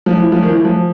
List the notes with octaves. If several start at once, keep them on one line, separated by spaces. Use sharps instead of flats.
F3
E3
F3
D#3
E3
F3